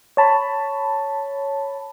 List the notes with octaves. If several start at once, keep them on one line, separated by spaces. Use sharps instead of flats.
C#5 A5 B5